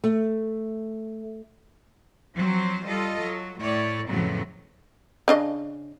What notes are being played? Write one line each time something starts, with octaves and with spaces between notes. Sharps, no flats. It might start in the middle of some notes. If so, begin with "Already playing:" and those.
A3
F3 F#3 C4 C5
G3 F4 A4 D#5
F#3
A2 C#5 D5
F2 A2 C#3 F3 F#3 B3
C#3 D4 D#5